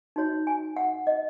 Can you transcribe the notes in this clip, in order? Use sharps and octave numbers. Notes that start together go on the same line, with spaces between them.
D#4 F#4 C#5
G#5
F#5
D#5